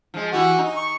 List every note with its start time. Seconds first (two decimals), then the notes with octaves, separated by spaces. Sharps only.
0.14 F3 G#3
0.33 E3 E4 F#4 G4
0.59 D#4
0.76 C#6